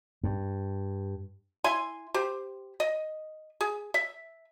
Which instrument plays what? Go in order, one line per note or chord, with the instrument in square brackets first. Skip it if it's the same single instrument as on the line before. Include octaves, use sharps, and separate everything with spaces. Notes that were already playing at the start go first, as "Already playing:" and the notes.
[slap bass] G2
[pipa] E4 G#5 C6
G4 C5
D#5
G#4
E5